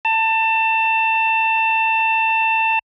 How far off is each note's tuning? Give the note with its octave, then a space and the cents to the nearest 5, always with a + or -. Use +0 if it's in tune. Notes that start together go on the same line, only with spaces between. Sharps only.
A5 +25